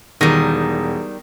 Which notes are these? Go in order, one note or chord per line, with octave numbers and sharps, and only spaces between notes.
E1 D#3 G3 A#6